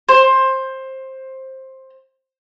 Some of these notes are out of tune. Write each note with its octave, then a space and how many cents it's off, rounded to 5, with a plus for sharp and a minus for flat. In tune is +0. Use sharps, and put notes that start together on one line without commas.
C5 +15